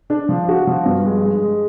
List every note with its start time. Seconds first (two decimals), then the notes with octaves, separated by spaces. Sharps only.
0.10 D4
0.29 F3
0.48 F#4
0.67 F3
0.85 G2
1.05 G#3
1.24 G#3
1.42 G#3